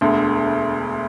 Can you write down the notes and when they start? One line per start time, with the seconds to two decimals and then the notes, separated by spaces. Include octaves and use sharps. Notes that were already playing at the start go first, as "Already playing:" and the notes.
0.01 E1 D2 D3